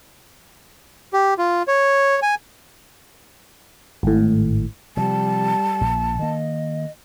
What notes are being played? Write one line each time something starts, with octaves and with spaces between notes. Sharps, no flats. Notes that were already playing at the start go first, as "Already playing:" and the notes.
G4
F4
C#5
G#5
G#1 A2
C3 F3 G3 A5
A#1 A#2
D#3 A#3 D#5